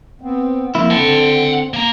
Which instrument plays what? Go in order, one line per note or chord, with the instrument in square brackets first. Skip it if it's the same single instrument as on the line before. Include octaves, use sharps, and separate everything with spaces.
[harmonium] B3 C4
[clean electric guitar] F2 A#3 E4
[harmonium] D3 [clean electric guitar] C4 [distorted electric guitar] F#5 A5
[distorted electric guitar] A#3 A#5